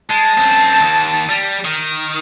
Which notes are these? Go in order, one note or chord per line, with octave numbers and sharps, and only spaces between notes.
G#3 A5
F#2 C4
D#2
G3
D#3